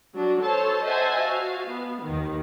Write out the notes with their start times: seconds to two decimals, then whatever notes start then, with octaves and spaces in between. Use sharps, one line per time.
0.15 F#3 D4 F#4
0.44 A4 C5 C#5 A5
0.82 C5 D#5 E5 F#5 G#5 A5
1.20 F#4 F5
1.68 B3
2.03 D#2 D#3